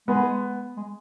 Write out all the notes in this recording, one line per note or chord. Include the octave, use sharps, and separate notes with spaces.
G#3 B3
G#3